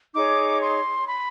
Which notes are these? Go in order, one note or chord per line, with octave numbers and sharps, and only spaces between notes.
D#4 G#4 C#5 D6
C6
B5